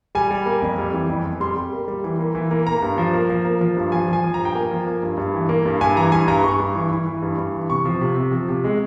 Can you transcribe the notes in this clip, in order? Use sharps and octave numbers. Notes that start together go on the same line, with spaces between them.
G3 G#5
G3
A#3
F2
G3
E3
F2
F2
G3 C6
G3
A#3
G3
E3
A#3
E3
A#3
A#3 A#5
G2
F3
A#3
F3
A#3
F3
G2
F3 G#5
F3 G#5
F3
A#5
G2
G5
A#3 G#5
F3
A#3
G2
G2
E3
A#3
G2
G2 G#5
E3 A#5
G2 G#5
G2 A#5
G2 C#6
G2
E3
E3
E3
G2
G2
E3
C3 C#6
F3
C3
C3
F3
C3
G#3